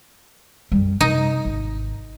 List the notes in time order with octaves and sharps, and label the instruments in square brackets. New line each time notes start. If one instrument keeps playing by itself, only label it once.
[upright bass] F#2 G3
[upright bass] C3 [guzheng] D#4
[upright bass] G#1